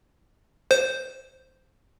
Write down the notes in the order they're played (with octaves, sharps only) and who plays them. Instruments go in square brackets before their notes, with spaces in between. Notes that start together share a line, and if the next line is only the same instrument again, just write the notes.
[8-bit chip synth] C5